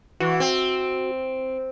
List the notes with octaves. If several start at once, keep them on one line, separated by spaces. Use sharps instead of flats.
E3 F#4
C4